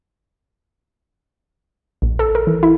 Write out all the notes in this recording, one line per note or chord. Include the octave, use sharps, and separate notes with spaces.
A#1
A4
A#4
E3
E4